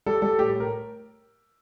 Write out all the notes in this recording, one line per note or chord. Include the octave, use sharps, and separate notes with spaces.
G3 A4
G3 A4
A2 G4
A2 A#4